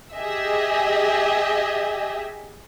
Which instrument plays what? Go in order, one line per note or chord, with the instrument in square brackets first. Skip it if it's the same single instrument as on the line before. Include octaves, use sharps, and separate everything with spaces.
[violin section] G4 G#4 D#5 E5